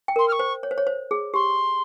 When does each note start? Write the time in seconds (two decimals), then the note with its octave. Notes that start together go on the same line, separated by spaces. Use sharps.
0.08 G5
0.16 A#4 C6
0.28 F6
0.32 C#6
0.39 C5
0.63 C#5
0.71 C5
0.78 C#5
0.87 C5
1.11 G#4
1.34 G4 C6